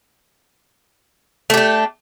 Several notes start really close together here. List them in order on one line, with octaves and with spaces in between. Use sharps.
A3 G4 D4